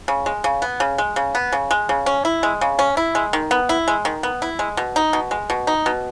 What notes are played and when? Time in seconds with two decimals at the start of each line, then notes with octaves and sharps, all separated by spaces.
0.08 C#3
0.26 G#3
0.44 C#3
0.62 B3
0.80 C#3
0.98 G#3
1.16 C#3
1.35 B3
1.52 C#3
1.71 G#3
1.89 C#3
2.06 C#4
2.25 E4
2.43 G#3
2.61 C#3
2.79 C#4
2.97 E4
3.15 G#3
3.33 D#3
3.51 B3
3.69 E4
3.88 G#3
4.05 D#3
4.23 B3
4.42 E4
4.59 G#3
4.77 B2
4.96 D#4
5.13 B2
5.31 G#3
5.50 B2
5.67 D#4
5.86 B2